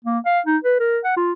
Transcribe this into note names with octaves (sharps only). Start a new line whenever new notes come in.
A#3
F5
D#4
B4
A#4
F#5
F4